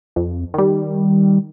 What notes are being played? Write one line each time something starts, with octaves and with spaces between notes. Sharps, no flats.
F2
D#3 G3